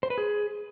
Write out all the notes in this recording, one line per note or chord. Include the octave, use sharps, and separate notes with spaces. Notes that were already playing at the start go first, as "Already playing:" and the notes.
C5
B4
G#4